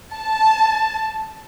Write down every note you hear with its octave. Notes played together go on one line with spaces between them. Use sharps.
A5